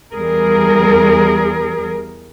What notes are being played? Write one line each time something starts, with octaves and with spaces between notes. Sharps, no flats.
E2 G3 G#4 A#4